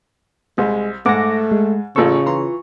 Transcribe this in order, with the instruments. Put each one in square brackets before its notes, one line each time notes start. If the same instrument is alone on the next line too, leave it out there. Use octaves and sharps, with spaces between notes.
[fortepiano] C2 [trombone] G#3
[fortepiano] G#2 F#5 [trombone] A3 [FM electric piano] D6 A#6
[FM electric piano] G#3
[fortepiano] A1 A4 [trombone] C#3 [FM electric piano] F4 C#6
[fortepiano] E3 A#5 C6